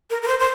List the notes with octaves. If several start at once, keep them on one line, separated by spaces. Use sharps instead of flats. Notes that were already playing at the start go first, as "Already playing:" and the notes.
A#4
A#4
C5
C5